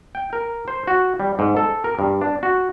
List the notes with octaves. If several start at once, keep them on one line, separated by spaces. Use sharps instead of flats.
G5
A#4
C5
F#4
G3
G#2
A4
A#4
G2
D4
F#4